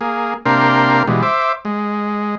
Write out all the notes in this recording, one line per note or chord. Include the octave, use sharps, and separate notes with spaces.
A#3 G#4
C3 A#3 D4 A#4 G5 C6
B2 E3 G3 G#3
C5 E5 D6
G#3